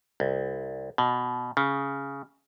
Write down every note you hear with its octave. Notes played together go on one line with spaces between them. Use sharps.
C2
B2
C#3